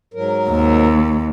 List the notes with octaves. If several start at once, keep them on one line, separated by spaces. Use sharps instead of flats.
G#2 F#3 A#4
D#2